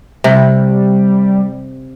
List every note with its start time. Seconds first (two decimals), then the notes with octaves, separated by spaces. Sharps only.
0.24 C3 G3